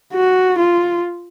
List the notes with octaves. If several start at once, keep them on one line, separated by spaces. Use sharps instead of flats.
F#4
F4